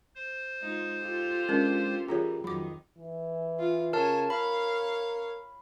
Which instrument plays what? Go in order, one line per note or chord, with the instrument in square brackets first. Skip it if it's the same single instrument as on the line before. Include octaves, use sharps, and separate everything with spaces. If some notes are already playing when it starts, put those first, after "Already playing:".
[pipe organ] C5
[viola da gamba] G#3 D#4 F4
F4 G4 A4
[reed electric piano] G#3 D4 [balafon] C#4 A#4
[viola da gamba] E3 G3 [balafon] F4 G#4 C#5 [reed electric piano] G4 A#4 A#5
[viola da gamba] F2 D#3 [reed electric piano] F#3 [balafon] B5 D6
[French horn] E3
[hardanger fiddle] F4
[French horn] C#3 [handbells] A#4 A5 [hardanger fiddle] C#5 G#5
[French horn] A#4 [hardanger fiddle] C#5 F5 [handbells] B5